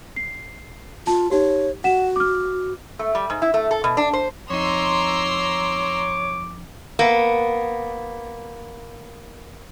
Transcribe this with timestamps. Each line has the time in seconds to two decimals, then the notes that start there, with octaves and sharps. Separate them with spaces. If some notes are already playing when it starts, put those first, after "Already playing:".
0.16 C7
1.07 F4 A5
1.31 D#4 G4 C#5
1.84 F#4 F#5 E7
2.16 D6 F6
2.99 A3
3.15 G3
3.30 G#2
3.42 E4
3.54 A3
3.71 A4
3.84 B2
3.97 D4
4.13 C5
4.50 F2 D#4 C#5 A#5 C6 D6 E6
6.99 A#3 B3